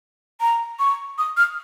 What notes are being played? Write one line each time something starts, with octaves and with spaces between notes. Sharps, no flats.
A#5
C#6
D#6
F6